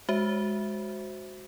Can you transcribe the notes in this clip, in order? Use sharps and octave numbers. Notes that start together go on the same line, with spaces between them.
G#3 F#4 C5 E5